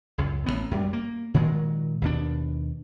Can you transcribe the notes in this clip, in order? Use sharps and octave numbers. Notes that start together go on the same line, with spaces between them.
C#2 F#2
A1 B2 B3
F#2 G3
A#3
A#2 D#3 F#3 G#3
D#2 B2 D4